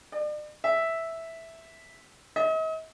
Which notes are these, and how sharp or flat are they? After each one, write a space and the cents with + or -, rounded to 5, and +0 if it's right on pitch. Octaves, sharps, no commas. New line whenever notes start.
D5 +40
E5 -5
D#5 +40